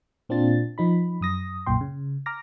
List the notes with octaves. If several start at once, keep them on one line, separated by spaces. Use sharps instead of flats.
A#2 C4 D4 F4 A6
F3 D#4 B5
F#2 D#6 A#6
B1 F#2 A#2 G5 C6
C#3
A#5 D6 F6 A#6